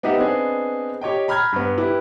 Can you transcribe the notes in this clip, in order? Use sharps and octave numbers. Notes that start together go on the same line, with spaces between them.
B3 D#4 G4 D#5 E5 F#5
B3 C4 D4 G#4 D#5
G4 C#5 D#5 G5
A#5 B5 F6 G6 G#6
G2 B3
E4 G4 B4